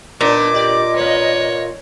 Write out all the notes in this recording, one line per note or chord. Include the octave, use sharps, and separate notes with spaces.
A#2 B3 D4 D#4 D6
G4 D5 D#5
A#3 B4 C#5